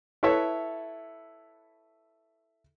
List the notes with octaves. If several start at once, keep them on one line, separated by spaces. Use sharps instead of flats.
E4 A4 B4 C#5 E5